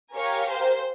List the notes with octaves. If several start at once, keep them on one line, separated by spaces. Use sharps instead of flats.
G4 A#4 C#5 F5 G#5
C5